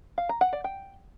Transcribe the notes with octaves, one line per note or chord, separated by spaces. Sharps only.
F5
A#5
F#5
D5
G5